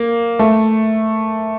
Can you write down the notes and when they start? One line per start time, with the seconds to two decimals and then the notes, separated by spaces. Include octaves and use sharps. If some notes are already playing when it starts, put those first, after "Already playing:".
Already playing: A#3
0.39 A3